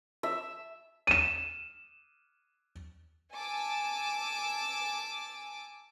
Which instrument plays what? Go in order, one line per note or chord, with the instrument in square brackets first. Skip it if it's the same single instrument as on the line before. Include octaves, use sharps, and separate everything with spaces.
[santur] E5
[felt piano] D#7 E7
[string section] G#5 A5 D6 E6